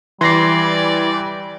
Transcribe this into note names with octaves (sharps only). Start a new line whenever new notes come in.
E3 G3 D5 C6 A#6 C7